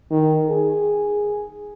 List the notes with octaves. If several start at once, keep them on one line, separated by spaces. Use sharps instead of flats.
D#3
G#4